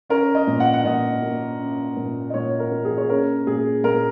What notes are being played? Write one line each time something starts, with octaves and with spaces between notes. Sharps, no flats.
C#4 A#4
D#5
A#2
F#5
F#5
A#2 D#5
A#3
C#4
A#2
D#5
A#2 C#5
A#4
A#3
G#4
C#5
C#4 A#4
A#2 G#4
A#2 A#4